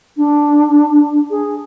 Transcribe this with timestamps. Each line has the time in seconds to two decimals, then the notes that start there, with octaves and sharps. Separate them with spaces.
0.17 D4
1.30 G#4